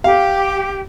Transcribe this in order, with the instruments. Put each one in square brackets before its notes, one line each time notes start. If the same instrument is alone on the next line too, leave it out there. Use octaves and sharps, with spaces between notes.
[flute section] G4 [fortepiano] F5